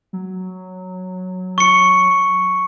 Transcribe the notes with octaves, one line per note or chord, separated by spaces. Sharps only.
F#3
C#6 C#7